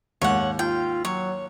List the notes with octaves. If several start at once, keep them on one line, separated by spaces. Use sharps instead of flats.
D#2 G#2 C#5 F#5
F4 G5
F#3 C#5